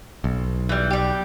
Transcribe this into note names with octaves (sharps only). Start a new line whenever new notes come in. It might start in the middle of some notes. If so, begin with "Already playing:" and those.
B1
E3 G3
G3 G4